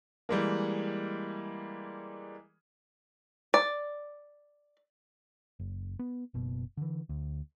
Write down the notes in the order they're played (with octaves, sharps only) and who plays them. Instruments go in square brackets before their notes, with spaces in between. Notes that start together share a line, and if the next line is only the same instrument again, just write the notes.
[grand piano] E3 G3 G#3 A#3
[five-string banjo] D5
[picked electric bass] F#1
B3
F#1 B2
D3 E3
D2